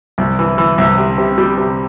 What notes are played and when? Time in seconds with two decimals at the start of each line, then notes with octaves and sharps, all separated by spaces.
0.18 C2
0.39 E3
0.58 E3
0.78 C2
0.98 C3
1.18 C3
1.38 G3
1.58 C3